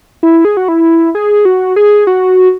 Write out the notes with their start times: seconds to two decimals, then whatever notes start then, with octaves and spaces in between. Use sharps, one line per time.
0.23 E4
0.45 G#4
0.57 F#4
0.68 E4
1.15 G#4
1.45 F#4
1.76 G#4
2.07 F#4